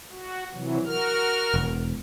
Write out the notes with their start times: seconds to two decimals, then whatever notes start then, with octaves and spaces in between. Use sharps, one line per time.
0.12 F#4
0.53 C3 E3 F#3
0.86 F#4 A#4 F6
1.54 E1